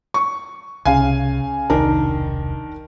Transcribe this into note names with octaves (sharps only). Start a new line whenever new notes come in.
C#6
C2 C#3 F5 G#5
E1 C2 D#3 D4 A#4